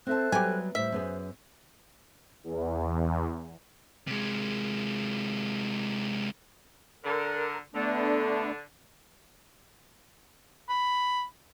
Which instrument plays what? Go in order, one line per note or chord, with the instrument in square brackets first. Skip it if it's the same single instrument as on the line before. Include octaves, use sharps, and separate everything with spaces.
[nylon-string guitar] C4 E5 A5 [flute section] A4 C5 F#6
[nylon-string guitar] F#3 G3 B3 [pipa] G4 G#5
[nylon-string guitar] A2 G3 [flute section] C5 [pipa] E5
[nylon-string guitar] F#2 B3 G#4
[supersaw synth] E2
[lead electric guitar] C3 G#3
[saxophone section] D3 [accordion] A#4
[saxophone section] D3 [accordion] A3 B3 D4
[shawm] B5